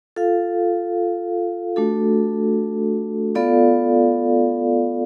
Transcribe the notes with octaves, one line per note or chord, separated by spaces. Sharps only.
F4 A4 F5
A3 D4 F#4 A4
B3 F4 A4 D5 F5